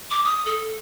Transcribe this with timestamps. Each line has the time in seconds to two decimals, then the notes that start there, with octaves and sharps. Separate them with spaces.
0.10 D6
0.24 D#6
0.46 A4